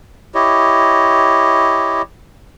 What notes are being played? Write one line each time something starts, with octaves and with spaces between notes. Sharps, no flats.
E4 G4 C#5 D#5